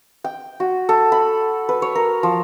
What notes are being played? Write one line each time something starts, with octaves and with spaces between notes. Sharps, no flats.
G5
F#4
A4
B5
B4
C#5
A#4
F3